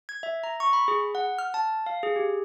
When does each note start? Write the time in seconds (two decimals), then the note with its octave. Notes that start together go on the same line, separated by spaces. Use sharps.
0.09 G#6
0.23 E5
0.44 A#5
0.60 C#6
0.73 B5
0.88 G#4
1.15 F#5
1.39 F6
1.54 A5
1.86 F5
2.03 G#4
2.16 G4